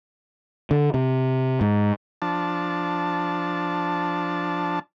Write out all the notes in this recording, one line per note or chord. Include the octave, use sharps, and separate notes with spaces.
D3
C3
G#2
F3 D4 A5